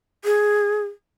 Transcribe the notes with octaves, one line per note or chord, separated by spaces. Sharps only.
G#4